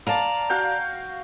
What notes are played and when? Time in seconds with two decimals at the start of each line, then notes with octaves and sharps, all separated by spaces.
0.07 D5 F5 A5 A#5
0.50 F#4 F5 G5